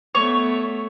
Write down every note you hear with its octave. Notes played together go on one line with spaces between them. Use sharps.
A3 B3 C#5